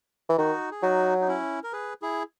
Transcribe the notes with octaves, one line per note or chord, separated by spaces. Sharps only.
E3
D#3 D#4 F#4
G#4
F#3 D#4 F#4
D#4
C#4 E4
A#4
G#4 B4
E4 G#4